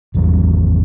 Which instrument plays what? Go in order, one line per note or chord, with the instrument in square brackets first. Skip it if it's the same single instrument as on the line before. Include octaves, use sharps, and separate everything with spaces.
[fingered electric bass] G#1 E2 E3 F#3